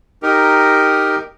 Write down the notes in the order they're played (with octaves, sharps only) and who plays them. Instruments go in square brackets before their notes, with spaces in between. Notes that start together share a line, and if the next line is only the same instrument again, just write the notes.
[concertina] D#4 G4 A#4